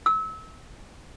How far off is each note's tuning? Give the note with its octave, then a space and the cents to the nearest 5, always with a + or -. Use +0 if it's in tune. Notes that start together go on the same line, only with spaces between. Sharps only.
E6 -30